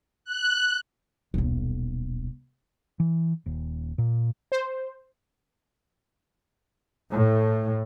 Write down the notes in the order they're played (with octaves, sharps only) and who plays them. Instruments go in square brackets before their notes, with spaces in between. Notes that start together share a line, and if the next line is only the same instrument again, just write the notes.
[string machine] F#6
[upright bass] D#1 B1
[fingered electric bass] E3
D#1
A#2
[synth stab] C5
[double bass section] A2